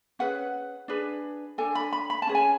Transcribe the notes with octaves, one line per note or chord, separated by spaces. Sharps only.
C#4 G#4 B4 F#5
D4 G#4 B4
D4 A4 G#5
B5
B5
B5
A5
C#4 G#4 B4
G#5